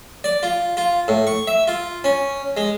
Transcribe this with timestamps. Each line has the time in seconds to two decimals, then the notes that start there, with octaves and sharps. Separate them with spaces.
0.24 D5
0.43 F4
0.77 F4
1.08 A2
1.27 C#6
1.47 E5
1.68 F4
2.04 C#4
2.57 G#3